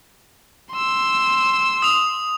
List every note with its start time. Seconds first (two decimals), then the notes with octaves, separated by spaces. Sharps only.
0.73 C6 E6
1.82 D#6 F7